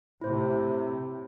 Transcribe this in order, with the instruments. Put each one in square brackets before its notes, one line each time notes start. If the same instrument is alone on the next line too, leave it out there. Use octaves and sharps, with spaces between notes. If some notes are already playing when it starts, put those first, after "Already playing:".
[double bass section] A2 C3 [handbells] E4 C5